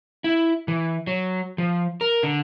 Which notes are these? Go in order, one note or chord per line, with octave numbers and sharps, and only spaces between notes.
E4
E3
F#3
F3
A#4
D3